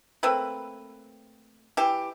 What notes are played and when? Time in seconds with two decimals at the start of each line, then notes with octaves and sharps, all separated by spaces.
0.23 A3 A#3 C4 B4
1.77 E3 G4